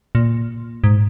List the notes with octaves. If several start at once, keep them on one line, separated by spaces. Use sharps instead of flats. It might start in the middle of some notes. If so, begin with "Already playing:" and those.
A#2
G#2